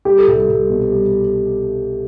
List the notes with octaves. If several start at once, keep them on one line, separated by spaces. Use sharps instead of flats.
G3 G4
A4
C2 G4
C2
B2
G3